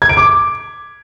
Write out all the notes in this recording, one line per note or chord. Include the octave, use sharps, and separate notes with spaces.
G#6
D7
D6